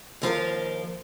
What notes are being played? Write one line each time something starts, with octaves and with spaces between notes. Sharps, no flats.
D#2 F3 F4 A#4